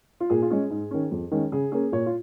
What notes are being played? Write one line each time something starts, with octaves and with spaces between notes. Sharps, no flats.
F4
A#2 G#4
F4
G#3 C#4 G#4
G#2
D#3 C#4
F2
D#3 G#3 C#4
C#3 G#4
A#3 C#4 G#4
A#2 C#5
F4